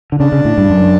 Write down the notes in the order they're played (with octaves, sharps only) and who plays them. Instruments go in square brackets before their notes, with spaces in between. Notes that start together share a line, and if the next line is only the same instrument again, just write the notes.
[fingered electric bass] D3
[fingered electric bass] C#3 [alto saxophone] D4
[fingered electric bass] C#3
A2
G2
F#2